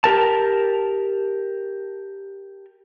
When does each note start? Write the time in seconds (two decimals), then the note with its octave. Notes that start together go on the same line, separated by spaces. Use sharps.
0.04 G4 A#4 A5